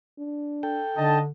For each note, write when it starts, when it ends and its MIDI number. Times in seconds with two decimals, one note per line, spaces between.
0.18 0.80 62
0.63 1.19 69
0.63 1.19 79
0.97 1.30 50
0.97 1.19 62
0.97 1.20 63
0.97 1.20 75
0.97 1.20 81